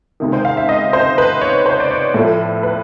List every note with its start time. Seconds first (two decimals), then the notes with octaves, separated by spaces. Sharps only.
0.20 C#2 C3 D#3
0.33 C5
0.45 F5
0.57 E5
0.69 D#5
0.93 C5
1.18 B4
1.41 C#5
1.66 C5
1.80 D5
1.91 C#5
2.14 A2 F3 A3
2.63 B4